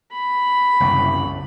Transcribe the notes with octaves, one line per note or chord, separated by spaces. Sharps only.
B5
F#1 C2